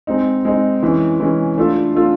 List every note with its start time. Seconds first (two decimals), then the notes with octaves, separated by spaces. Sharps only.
0.07 G#3 C4 D#4
0.45 G#3 C4 D#4
0.83 E3 G#3 C#4
1.20 E3 G#3 C#4
1.58 A3 D4 F4 A4
1.95 A3 D4 F4 A4